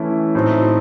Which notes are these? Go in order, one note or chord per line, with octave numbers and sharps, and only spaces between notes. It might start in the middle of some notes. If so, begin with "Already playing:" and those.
Already playing: E3 A3 C#4 E4
A2 F#3 A3 C4 D#4